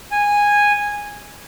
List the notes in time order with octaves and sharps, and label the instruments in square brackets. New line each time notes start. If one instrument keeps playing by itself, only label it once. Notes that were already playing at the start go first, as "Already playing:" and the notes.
[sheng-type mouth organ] G#5